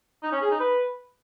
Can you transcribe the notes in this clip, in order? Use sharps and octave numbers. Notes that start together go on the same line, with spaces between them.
D#4
C#4
G#4
D#4
B4